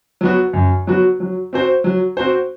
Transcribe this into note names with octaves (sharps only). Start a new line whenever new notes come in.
F#3 B3 F#4
F#2
F#3 B3 F#4
F#3
C4 F#4 C5
F#3
C4 F#4 C5